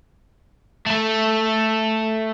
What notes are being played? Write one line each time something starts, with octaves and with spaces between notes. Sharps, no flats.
A3 A4